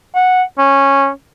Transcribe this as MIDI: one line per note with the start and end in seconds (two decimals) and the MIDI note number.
0.15 0.43 78
0.58 1.09 61